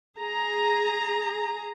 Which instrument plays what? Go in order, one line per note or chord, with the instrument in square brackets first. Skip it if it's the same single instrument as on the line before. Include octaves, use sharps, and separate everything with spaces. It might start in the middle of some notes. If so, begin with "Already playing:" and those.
[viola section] G#4 A#5